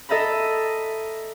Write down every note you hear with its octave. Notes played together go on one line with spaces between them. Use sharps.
A4 D#5 E5 A#5 B5